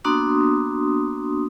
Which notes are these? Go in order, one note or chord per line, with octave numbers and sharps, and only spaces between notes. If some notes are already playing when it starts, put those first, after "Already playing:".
A#3 B3 D4 F#4 C6 D#6